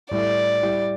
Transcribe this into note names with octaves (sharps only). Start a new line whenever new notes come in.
A2 G3 E4 A4 D5
G3 E4 G4